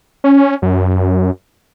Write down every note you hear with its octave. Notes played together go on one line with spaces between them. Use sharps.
C#4
F#2